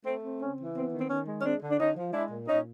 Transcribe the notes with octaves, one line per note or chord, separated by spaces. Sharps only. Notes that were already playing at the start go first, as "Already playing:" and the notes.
A3 C4
C4
C#3 C#4
E3
B3 C4
D#3
C4
D#3 C#4
G#3
C#4
G#3 C4 D4
D3
D4
D3 C#4 D#4
F3
G#3 D4 E4
A#2
A#2 C#4 D#4